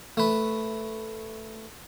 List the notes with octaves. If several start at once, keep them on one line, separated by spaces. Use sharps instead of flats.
A3 B4